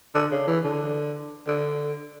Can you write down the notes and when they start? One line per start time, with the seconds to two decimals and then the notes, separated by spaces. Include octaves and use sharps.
0.15 D3
0.31 C#3
0.47 E3
0.64 D3
1.47 D3